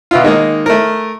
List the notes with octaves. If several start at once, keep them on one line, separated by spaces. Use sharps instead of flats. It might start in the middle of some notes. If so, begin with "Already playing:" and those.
B2 E4 F4
D#3 G#3 A#3 D#4
A3 A#4